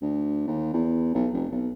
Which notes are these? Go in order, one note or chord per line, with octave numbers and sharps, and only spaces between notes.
D2
D#2
E2
B1
F1
B1